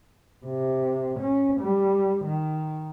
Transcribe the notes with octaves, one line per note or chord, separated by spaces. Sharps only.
C3
C#4
G3
D#3